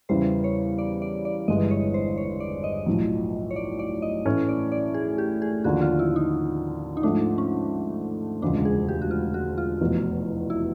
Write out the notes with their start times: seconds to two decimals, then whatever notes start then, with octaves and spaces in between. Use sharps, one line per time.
0.09 E2 C#3 E3 G3 C5
0.44 C#5
0.78 D5
1.02 D5
1.25 D5
1.48 G1 G2 E3 G#3 D#5
1.71 C#5
1.94 C5
2.17 C#5
2.40 D5
2.64 D#5
2.86 B1 A2 F3
3.51 C#5
3.56 D5
3.79 D5
4.02 D#5
4.25 A2 E3 A3 C#4
4.49 D5
4.72 D5
4.94 G#4
5.18 G4
5.42 G#4
5.64 D#2 D3 F3 F#4
5.82 F4
5.99 E4
6.16 D#4
6.97 D#4
7.03 G#2 F3 A3 D4
7.38 C#4
8.42 E1 D2 C#3 F3 G#3 D4
8.65 G#4
8.89 G4
9.02 F#4
9.11 F4
9.34 F#4
9.58 F4
9.81 F1 E2 B2
10.50 E4